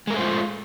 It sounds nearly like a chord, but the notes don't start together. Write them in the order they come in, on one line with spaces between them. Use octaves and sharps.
G#3 A#4 A3 C5 F4